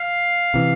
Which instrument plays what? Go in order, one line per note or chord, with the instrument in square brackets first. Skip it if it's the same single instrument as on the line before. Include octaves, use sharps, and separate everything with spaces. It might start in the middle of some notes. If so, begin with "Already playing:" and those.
Already playing: [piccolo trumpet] F5
[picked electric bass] C3 E3